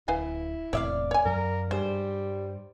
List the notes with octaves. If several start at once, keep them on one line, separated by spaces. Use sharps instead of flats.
D1 E4 B4 F5 G#5
E1 A2 C3 C#5 D5 E5 F5
C#5 G#5
F#2 F#3 A#4
G2 G3 G#3 C5